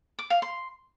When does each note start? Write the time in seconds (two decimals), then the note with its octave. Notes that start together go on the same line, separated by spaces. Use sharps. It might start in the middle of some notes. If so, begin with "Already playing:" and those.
0.19 D6
0.30 F5
0.42 C6